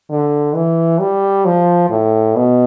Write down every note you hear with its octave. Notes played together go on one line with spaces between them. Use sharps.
D3
E3
G3
F3
A2
B2